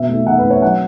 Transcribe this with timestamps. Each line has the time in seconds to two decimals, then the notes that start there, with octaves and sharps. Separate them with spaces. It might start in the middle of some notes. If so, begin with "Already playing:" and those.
Already playing: B2 E5
0.09 A3 D#4
0.27 B2 F#5
0.38 B4
0.44 A3 D#4
0.50 C#5
0.62 F#3 F#5